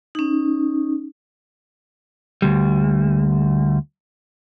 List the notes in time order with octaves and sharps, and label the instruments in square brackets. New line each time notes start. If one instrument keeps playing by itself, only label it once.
[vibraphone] C#4 D#4
[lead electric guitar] D2 G3